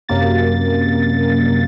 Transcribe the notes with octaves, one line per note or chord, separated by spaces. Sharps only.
F#2 C3 A#3 A6